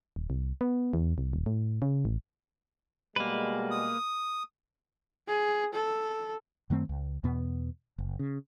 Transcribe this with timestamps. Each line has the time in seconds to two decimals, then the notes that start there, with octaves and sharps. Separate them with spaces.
0.16 D#1
0.30 C2
0.61 B3
0.93 E2
1.18 C2
1.33 D#1
1.46 A2
1.82 C#3
2.05 A1
3.16 B2 G3 G#3 A#3 B4
3.71 D#6
5.28 G#4
5.74 A4
6.70 F#2 D#3 A3 C4
6.89 C#2
7.24 E2 B2 B3
7.98 F#1
8.19 C#3